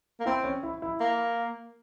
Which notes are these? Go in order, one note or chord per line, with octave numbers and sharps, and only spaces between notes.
A#3
C4 E4
C#4
E4
E4
A#3